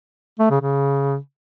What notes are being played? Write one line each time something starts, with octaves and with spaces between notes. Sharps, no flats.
A3
C#3
C#3